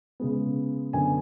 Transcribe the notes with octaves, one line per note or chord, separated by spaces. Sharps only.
C#3 G#3 B3
F#2 D3 F#3 B3 G#5